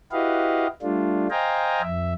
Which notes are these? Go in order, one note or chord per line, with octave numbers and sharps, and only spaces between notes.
E4 F#4 G4 B4 D#5 F5
G3 A3 D4 F4
C5 D#5 F5 G5 G#5 A#5
F2 E5